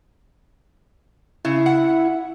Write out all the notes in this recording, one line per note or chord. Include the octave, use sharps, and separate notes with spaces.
C#3 E4
F#5